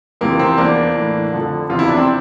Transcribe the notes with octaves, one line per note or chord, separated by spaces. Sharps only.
F2 C3 E3 A#3
C4
E2 E3 A#3 D4
A2 E3
F2 D3 F3
E2 C3 F3 F4
E4
D4
C4